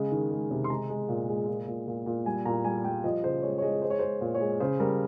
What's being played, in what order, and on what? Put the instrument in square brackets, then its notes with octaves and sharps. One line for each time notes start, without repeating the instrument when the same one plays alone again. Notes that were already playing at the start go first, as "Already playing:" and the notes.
Already playing: [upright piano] C#3 G#3
D#3
G#3
C3
C6
G#3 A#5
G#3
A#2
G#3
A#2
A#2
A#2
A#2
G3 G#5
A#2 A#5
G3 G#5
G3 G5
F3 D#5
C#3 C5
G#3 C#5
C#5
G#3 D#5
G#3 C5
C#5
G#3 C5
A#2
C#5
G#3
C#3 C5
G3 A#4